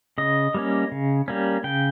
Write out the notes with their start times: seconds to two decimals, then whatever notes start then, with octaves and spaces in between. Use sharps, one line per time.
0.18 C#3 D#5
0.54 G3 A#3 C#4
0.92 C#3
1.28 G3 A#3 C#4
1.64 C#3 G5